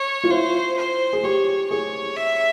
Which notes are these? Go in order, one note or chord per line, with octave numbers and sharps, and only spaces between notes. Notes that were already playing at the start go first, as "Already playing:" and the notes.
Already playing: C#5
F4
E4 C5
C5
G#4
G4 C#5
G#4 C#5
E5